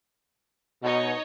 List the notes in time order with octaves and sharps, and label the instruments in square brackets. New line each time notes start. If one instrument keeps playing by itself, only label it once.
[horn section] B2 [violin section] D#4 C#5 D#5